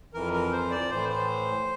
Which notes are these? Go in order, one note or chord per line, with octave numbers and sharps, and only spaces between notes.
F2 E3 A#4
A#4
C5
D5
A2 E3 C5
C5